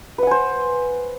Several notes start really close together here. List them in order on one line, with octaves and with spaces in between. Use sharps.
B4 F#5 G#5 C5